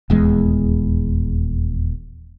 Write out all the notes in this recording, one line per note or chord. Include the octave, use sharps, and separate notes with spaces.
D#1 E2 G#3